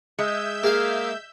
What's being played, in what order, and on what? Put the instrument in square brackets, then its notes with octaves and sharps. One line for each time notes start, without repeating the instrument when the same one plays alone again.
[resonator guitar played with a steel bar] G#3 [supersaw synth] E5 E6 G6
[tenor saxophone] A#3 [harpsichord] G#4 F5